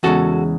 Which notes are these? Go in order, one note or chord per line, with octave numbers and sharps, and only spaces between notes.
E2 C#3 G#3 F#4 A4